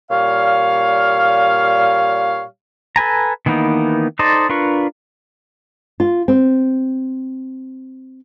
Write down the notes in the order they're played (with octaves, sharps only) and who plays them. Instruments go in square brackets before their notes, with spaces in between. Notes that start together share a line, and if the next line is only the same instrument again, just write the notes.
[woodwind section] A#2 G3 C#5 F5
[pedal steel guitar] A4 B4 G#5 A#5
D#3 E3 A#3 B3 D#4
D#4 A4 C5 D5 D#5
D4 F4 A#4 B4 C#6
[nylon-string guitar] F4
C4